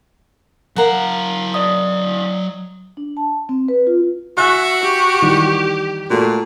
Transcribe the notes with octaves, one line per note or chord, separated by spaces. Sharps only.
F#3 A#4 F5 F#5
D5 D#5 D#6
D4
A5
C4
B4
F4
F#4 E5 G#5 F#6
G4
D#3 E3 G3
A#2 A3 F#4